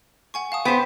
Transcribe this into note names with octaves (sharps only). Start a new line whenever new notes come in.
F#5 G#5 C#6
F5 A5 D#6
B3 C5 G5 B6